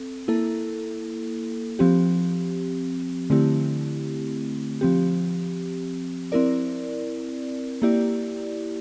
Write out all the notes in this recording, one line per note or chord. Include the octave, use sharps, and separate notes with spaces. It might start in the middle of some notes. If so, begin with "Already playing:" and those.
Already playing: C4 A4
A#3 E4 A4
F3 C4 G4
D3 A3 C4 E4 G4
F3 C4 G4
C4 E4 A#4 D5
A#3 E4 G4 D5